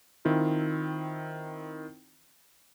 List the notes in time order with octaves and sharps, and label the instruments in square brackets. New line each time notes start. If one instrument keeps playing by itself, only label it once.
[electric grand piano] D#3 C4 E4 F4